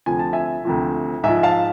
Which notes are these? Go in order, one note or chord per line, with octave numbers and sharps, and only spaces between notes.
D2 C3 F3 G#5
A5
E5 G#5
D2 C3 F3
G#2 F3 E5 G#5
F5 A5